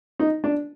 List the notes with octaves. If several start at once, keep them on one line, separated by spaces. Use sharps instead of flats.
D#4
D4